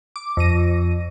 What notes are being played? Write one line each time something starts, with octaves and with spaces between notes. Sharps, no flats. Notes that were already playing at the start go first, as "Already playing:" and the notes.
D6
F2 A#6 D#7